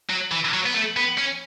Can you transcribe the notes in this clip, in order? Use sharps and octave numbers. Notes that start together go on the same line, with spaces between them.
F#3
E3
F#3
B3
A3
B3
C#4